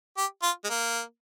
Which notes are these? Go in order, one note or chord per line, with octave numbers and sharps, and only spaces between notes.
G4
F4
G#3
A#3